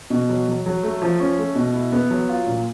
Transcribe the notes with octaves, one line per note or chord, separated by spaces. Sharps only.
B2
F#3
F#3
F#3
A3
F3
C#4
A3
B2
E4
B3
F#3
F4
A#2